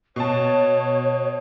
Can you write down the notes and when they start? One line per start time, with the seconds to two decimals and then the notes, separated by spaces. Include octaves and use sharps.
0.16 B2 C#5 A5